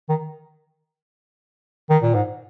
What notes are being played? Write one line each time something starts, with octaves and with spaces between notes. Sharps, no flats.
D#3
D#3
A#2
G#2